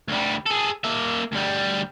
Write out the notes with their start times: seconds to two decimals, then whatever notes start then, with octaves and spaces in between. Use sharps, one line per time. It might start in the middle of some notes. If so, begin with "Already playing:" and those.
0.08 D2 G3
0.46 G#4 A4
0.84 A#3 E5
1.32 D2 G3